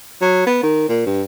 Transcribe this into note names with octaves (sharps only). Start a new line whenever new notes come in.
F#3
B3
D#3
A#2
G2